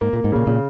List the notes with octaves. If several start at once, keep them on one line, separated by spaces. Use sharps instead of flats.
G#2 A#3
A#2 A#3
G#2
A#2 C#3
A#2 C#3